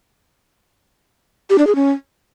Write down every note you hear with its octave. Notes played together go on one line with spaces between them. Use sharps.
G4
D4
G#4
C#4